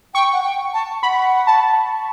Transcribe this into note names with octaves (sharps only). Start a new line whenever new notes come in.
G5 C#6
F#5
G5
A5
F#5 B5
A5